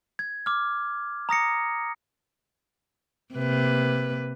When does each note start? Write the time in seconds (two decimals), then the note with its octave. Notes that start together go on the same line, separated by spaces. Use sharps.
0.19 G#6
0.46 D6 F6
1.29 A#5 D#6 A#6 C#7
3.34 C3 A#3 B4